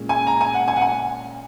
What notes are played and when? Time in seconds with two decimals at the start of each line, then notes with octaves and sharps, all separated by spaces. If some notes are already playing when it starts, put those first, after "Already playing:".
Already playing: A#2 G#3 C#4
0.09 G#5
0.27 A#5
0.41 G#5
0.54 F#5
0.68 G#5
0.76 F#5
0.81 G#5